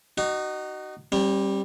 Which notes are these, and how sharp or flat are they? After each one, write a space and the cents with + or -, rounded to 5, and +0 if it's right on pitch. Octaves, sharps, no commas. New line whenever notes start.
D#4 -20 F#4 +30
G3 +0 C#4 -45